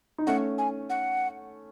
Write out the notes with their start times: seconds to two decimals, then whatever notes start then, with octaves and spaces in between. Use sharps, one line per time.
0.18 D#4
0.27 A3 C#4 F#5
0.58 G#5
0.90 F#5